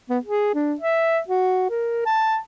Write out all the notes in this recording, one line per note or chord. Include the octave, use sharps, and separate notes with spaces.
B3
G#4
D4
E5
F#4
A#4
A5